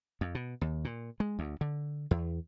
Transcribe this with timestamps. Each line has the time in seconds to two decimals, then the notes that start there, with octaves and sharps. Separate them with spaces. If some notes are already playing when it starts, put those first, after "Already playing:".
0.21 F2
0.35 B2
0.61 D#2
0.85 A#2
1.20 G#3
1.39 D2
1.61 D3
2.11 E2